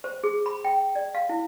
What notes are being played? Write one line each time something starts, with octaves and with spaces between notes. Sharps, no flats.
C5
G#4
B5
G5
D5
F5
E4